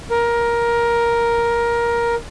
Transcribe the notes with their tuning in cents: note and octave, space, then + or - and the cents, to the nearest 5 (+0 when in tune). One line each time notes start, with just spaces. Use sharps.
A#4 +15